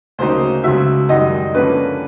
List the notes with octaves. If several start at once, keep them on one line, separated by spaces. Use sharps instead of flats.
D2 C#3 F#3 A#3 D#4 C5
C#2 C#3 F#3 E5
F#2 D#3 G3 D#5
D3 F3 A#3 C#4 B4